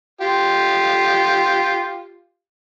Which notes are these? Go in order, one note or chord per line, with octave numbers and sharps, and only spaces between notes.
F4 G4